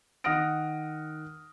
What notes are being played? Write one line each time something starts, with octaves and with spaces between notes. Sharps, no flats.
D#3 F#5 D#6 F6 A#6 D7